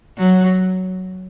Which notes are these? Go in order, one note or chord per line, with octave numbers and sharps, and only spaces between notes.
F#3